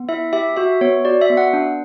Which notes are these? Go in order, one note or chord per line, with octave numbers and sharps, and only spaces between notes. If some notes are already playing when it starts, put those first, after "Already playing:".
Already playing: B3
E4 E5
G4 E5
F#4 E5
B3 C#5
F#4 D5
E5
B3
F#5
D4